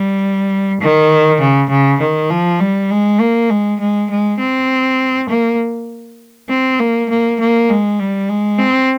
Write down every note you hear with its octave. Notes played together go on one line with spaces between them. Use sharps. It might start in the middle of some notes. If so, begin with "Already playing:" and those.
Already playing: G3
D#3
C#3
C#3
D#3
F3
G3
G#3
A#3
G#3
G#3
G#3
C4
A#3
C4
A#3
A#3
A#3
G#3
G3
G#3
C4